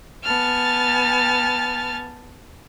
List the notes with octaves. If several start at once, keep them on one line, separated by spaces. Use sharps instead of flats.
B3 G#5 A5 F6 A6